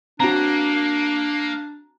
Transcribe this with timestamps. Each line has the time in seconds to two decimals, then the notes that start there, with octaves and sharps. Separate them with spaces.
0.20 A#3 C4 D4 F#4 A#5